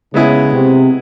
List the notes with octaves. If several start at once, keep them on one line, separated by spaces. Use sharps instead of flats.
C#3 G#3 B3 E4 G#4
C3